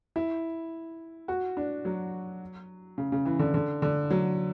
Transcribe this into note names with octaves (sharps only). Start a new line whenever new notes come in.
E4
F#4
D4
F#3
C#3
C#3
E3
D3
D3
D3
F#3